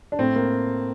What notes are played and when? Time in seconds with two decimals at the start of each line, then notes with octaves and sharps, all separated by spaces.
0.12 D4
0.19 A2 C4
0.36 A#3